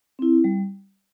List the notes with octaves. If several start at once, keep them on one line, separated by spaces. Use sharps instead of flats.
C4 E4
G3